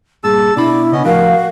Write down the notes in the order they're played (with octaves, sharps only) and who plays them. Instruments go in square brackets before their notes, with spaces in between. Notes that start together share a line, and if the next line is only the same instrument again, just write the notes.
[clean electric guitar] G2 A#2 [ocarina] G#4 [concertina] A5 E6
[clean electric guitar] B2 B5 [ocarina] D4 [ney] E4 [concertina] D5
[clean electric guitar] C#3 [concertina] B3 C#4 D#5
[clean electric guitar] A2 F3 G4 [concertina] F#4 [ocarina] A#4 [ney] F5